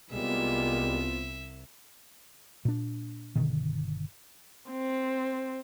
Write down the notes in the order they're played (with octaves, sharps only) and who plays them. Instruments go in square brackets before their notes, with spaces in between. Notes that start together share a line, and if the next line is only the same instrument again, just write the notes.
[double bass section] C2 [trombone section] G3 G#3 A#3 [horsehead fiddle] B3 F4 [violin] E5
[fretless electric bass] A#2 D4
G1 B2 D3 D#3
[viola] C4